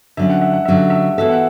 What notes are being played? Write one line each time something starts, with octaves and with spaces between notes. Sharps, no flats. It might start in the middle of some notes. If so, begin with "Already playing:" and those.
D3 F#3 C#4 E5
F#5
E5
F#5
D3 F#3 C#4 E5
F#5
E5
E3 B3 F#4 A4 E5
F#5